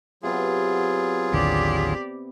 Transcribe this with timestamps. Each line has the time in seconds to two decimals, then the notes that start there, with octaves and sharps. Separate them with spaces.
0.23 C3 F#3 B3 F4 G#4
1.32 A1 D#2 D3 G4 D5